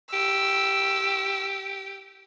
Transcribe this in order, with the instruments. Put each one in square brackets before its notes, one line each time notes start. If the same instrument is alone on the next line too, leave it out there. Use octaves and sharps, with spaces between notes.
[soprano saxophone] G4 [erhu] E6